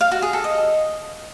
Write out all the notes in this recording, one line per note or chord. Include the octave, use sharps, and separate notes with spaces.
F5
F#4
G#4
A4
D#5